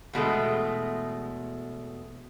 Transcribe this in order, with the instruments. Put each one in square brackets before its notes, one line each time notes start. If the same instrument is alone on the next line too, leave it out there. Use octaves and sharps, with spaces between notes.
[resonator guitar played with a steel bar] E2 B2 G#3 A3